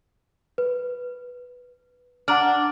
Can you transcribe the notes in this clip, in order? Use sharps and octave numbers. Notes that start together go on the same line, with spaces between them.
B4
D4 F#5 A#5 F6